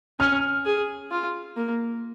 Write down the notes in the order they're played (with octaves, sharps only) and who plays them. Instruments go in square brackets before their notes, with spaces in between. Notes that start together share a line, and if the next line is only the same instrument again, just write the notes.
[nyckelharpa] C#4 [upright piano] F6
[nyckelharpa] G#4
F4
A#3